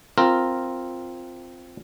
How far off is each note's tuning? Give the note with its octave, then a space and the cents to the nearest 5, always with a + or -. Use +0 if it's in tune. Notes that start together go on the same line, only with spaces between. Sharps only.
C4 +0 F4 +0 A#4 -10